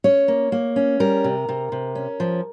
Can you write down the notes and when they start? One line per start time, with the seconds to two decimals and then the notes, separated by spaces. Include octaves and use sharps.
0.04 C#4 C#5
0.28 A#3
0.52 A#3
0.76 C#4
1.00 G3 A#4
1.24 C3
1.49 C3
1.72 C3
1.95 C#4
2.20 F3